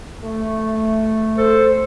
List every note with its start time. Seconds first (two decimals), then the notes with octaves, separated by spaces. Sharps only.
0.22 A3
1.38 A4 C5